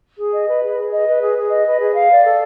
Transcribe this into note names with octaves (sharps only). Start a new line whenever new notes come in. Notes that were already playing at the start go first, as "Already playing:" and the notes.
G#4
D#5
B4
G#4
G#4
D#5
B4
G#4
G#4
D#5
B4
G#4
F5
D5
A4